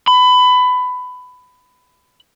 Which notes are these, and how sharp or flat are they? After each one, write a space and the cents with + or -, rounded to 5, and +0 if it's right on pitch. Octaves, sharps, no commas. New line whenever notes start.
B5 +20